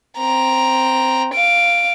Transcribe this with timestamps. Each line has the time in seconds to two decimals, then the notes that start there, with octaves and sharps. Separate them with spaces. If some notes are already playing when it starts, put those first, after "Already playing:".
0.18 C4 A#5
1.34 F5 D7